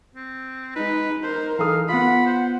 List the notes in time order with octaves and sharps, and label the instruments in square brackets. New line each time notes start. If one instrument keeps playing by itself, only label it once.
[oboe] C4
[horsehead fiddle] G#3 D#4 [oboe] B4
[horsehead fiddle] D#4 A#4 [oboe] C5
[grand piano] E3 A4 D#6 [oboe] F5
[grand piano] B3 F4 [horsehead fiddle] F#5 [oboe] B5
[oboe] C5